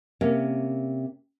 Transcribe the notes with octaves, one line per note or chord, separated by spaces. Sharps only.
C3 A#3 C#4